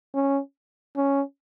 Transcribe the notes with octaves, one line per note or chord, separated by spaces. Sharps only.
C#4
C#4